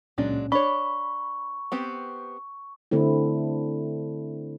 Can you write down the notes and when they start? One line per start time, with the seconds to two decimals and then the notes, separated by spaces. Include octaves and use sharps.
0.18 C#2 A#2 F#3 G#3 C#4 D4
0.52 D4 C#5 B5 C#6
1.72 B3 C4 G4
2.91 D3 A3 C4 E4